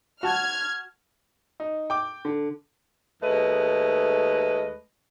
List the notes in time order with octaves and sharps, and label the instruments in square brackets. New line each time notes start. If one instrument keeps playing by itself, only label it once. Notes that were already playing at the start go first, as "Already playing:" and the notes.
[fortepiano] F#4 A5 [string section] F6 G#6
[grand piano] D#4
G5 D6
D3
[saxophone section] D#2 G#3 A3 B4 D#5